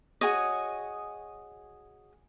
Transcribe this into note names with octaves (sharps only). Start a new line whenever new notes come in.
F#4 G#4 C#5 D#5